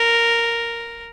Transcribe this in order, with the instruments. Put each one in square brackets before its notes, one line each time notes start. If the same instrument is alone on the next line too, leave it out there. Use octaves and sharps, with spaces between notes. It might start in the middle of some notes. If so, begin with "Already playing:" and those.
Already playing: [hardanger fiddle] A#4